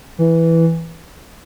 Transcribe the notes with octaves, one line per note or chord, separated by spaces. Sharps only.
E3